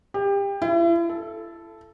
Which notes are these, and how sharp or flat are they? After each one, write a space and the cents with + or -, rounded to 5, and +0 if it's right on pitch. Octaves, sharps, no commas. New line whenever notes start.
G4 +25
E4 +40
A4 -5